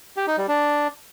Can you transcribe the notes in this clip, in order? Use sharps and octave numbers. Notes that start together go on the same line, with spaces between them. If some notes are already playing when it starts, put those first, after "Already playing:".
G4
D#4
G3
D4